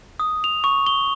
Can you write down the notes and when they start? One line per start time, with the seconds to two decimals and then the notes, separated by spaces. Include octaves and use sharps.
0.20 D#6
0.44 F7
0.64 C#6
0.86 G7